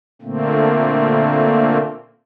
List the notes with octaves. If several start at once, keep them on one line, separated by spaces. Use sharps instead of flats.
A#2 D3 A3 A#3 C4